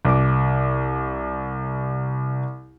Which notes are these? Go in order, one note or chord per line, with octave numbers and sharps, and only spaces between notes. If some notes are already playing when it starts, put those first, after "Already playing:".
C2 D6